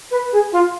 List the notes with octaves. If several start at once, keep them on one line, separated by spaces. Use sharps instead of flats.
B4
G#4
F4